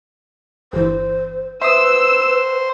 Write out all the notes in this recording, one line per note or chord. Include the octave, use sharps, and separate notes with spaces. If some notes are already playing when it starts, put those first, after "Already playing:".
G1 E3 C5
B4 C5 E5 C6 D#6 E6